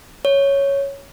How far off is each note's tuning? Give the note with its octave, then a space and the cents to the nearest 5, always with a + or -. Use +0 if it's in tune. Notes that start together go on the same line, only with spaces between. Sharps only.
C#5 +0